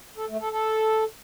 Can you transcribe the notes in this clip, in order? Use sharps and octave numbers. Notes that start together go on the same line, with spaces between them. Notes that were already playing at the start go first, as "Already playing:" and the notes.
A4
A3
A4
A4